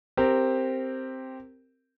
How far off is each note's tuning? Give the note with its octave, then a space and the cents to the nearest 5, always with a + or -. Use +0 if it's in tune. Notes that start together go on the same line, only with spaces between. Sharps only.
C4 +0 G4 +0 A#4 -15